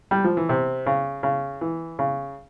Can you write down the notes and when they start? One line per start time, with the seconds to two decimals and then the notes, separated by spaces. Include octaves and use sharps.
0.11 G3
0.24 F3
0.37 E3
0.49 C3
0.86 C#3
1.23 C#3
1.61 E3
1.99 C#3